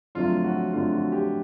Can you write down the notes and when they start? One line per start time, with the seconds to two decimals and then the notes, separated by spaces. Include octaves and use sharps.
0.15 F2 D3 F#3 A3 F4
0.44 F#4
0.73 F2 D3 F#3 A3 F4
0.92 F#4
1.12 G4